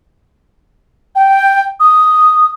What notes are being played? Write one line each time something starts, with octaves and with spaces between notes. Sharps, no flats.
G5
D#6